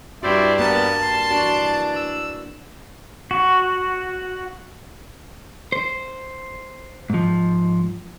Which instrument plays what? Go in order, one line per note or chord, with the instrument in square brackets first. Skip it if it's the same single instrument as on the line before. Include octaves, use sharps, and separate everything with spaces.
[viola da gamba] G2 G3 [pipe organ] E4 C5 D5 [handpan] F#4
[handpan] A#3 A#4 [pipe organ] B3 [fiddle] A5
[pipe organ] C6
[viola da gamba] E3 D4 [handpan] F#4
[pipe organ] E6
[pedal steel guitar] F#4
[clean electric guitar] C5
G#2 F3